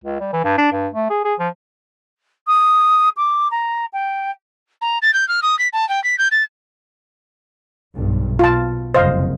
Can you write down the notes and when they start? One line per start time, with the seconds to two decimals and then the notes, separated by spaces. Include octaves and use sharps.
0.04 C#2
0.20 G3
0.33 E3
0.44 G2
0.58 D4
0.72 G2
0.94 A3
1.10 G#4
1.25 G#4
1.39 F3
2.47 D#6
3.16 D6
3.51 A#5
3.93 G5
4.81 A#5
5.02 A6
5.14 G6
5.28 F6
5.42 D#6
5.59 B6
5.73 A5
5.89 G5
6.04 B6
6.18 G6
6.31 A6
7.95 B1 G2
8.39 B2 F4 A5
8.94 F#1 C2 F2 C5 D#5 F5